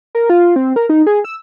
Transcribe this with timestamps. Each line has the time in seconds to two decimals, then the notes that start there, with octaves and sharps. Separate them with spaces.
0.15 A#4
0.30 F4
0.56 C4
0.76 A#4
0.89 D#4
1.07 G#4
1.24 E6